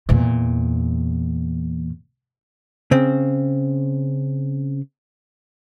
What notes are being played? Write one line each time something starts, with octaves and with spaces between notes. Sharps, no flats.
E2 A#2
C#3 C4